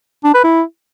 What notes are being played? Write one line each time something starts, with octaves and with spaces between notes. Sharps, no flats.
D4
B4
E4